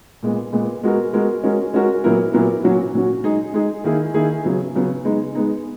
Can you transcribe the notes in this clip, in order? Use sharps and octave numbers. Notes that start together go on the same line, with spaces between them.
A#2 G#3 B3
A#2 G#3 B3
G#3 B3 F#4 A#4
G#3 B3 F#4 A#4
G#3 C#4 F#4 A#4
G#3 C#4 F#4 A#4
A#2 F#3 B3 E4 A#4
A#2 F#3 B3 E4 A#4
A#2 F#3 C#4 F#4
A#2 F#3 C#4 F#4
G#3 D#4 G#4
G#3 D#4 G#4
D#3 A#3 E4 G#4
D#3 A#3 E4 G#4
C#3 F#3 B3
C#3 F#3 B3
G#3 B3 D#4
G#3 B3 D#4